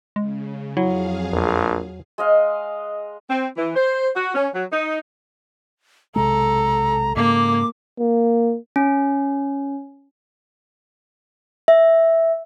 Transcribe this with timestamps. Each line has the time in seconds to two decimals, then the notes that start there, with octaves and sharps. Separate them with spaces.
0.16 C#3 G#3
0.77 F2 F#3 E4 G#4 F5
1.33 A#1 E2
2.18 G#3 D#5 F5
3.29 C4
3.57 E3
3.76 C5
4.15 F#4
4.34 C#4
4.53 F#3
4.71 D#4
6.16 B1 C3 G#3 A4 A#5
7.16 G#2 C#3 A#3 D6
8.00 A#3
8.76 C#4
11.68 E5